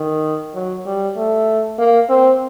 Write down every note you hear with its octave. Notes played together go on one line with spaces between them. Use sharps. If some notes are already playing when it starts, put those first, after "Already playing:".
Already playing: D#3
F#3
G3
A3
A#3
C4